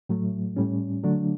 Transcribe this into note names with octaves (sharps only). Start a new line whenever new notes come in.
A2 F#3 A3
A2 G3 C#4
D3 F#3 A3 D4